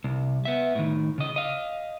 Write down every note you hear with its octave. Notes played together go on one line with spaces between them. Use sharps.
C2
B3 E5
A2 D#3
C#3 D#5
D#5 F5